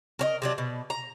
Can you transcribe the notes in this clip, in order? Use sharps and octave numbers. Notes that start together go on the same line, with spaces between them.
A#4 C#5 D#5
C3 F#3 D4
B2
A#5